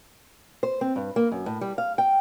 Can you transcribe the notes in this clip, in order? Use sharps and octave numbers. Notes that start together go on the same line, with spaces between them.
C5
C4
G2
A#3
F#2
A2
G3
F5
G5